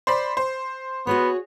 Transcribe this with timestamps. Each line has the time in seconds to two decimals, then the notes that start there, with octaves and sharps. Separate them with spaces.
0.07 C5 D5 B5
0.37 C5
1.07 B3 F#4 G#4 C#5